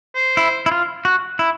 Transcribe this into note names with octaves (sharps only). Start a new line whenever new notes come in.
C5
E4
E4
F4
F#4
E4